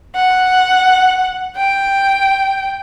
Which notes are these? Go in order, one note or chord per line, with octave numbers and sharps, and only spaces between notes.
F#5
G5